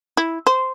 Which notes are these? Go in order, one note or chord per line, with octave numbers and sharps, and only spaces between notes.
E4
C5